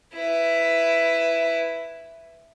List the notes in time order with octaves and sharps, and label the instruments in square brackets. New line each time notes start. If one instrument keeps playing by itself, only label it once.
[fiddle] E4 B4